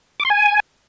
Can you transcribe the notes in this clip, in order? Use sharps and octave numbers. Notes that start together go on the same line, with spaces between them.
D6
C6
G#5